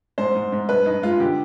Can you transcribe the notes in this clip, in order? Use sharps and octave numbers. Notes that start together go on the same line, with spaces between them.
G#2 C5
G#2
G#2
G2 B4
G2 D#4
G#3 F4
D3 G4